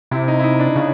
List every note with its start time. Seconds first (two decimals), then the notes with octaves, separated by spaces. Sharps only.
0.11 C3 E4
0.28 D#4
0.39 E4
0.44 D#4
0.59 D4
0.76 C#3